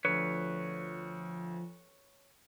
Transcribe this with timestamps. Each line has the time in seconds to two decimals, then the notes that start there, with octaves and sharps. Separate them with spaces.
0.05 D2 F3 B4 C#5